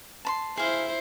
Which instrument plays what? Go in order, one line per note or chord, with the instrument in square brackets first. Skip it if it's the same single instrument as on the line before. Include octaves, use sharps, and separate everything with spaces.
[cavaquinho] A5 B5 C6
[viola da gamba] E4 C5 [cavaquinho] G#4 F5